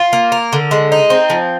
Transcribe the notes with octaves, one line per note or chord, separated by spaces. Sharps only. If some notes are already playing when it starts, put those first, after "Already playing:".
Already playing: F4
A#3
A#4
D3
G#3
D#4
C4
F3